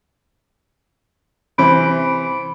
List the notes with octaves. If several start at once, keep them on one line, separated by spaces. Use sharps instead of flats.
C3 E3 C5 B5 D7